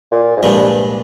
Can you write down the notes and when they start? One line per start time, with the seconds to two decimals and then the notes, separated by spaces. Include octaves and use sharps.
0.12 A#2
0.37 G#2
0.43 C2 G2 A#2 F3 G#3